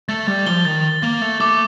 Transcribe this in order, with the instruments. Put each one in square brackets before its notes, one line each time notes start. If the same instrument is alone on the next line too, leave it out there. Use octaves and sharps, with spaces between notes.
[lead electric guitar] A3 [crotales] A6
[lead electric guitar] G3 [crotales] A6
[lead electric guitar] F3 [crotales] G7
[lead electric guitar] D#3 [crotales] A6
[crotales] A6
[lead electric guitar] A#3 [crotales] A6
[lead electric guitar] A3 [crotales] A6
[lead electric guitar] A3 [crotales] D6